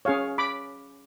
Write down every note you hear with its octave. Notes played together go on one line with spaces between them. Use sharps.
C#4 G#4 C#5 F5
B5 D6